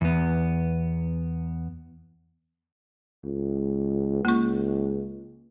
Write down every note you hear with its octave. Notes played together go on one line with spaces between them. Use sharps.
E2 B3
C#2
C#2 A#3 C#6